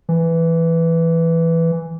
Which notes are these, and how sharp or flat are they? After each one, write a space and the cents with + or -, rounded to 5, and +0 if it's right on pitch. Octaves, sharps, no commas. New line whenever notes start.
E3 +5